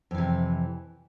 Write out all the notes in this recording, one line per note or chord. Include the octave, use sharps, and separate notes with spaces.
F2 C3 E3